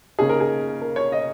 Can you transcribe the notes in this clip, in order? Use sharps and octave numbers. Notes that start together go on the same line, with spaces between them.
C#3 A#3 D#4 G#4
A#4
G#4
A#4
C#5
D#5